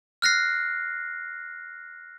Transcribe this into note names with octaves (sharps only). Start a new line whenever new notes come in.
F6 F#6 A#6 C7